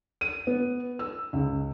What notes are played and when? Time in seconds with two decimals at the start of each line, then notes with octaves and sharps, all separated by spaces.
0.21 D#7
0.47 B3
0.99 E6
1.33 C#2